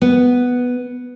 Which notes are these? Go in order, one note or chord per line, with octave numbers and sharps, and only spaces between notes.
B3